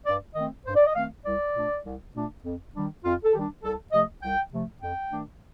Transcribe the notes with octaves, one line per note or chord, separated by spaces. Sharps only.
G2 D5
D#3 A3 C4 D#5
G2 C5
D5
D#5
D#3 A3 C4 F5
C2 D5
A#2 A3 D4
C2
A#2 A3 D4
F2
D#3 G3 D4
F2 F4
A4
D#3 G3 D4 G4
C2 A4
C3 F3 A3 D#5
C2 G5
C3 F3 A3
F2 G5
D#3 A3 D4